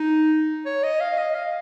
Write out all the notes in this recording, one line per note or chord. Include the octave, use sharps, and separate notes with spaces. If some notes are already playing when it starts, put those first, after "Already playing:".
Already playing: D#4
C#5
D#5
F5
D#5
F5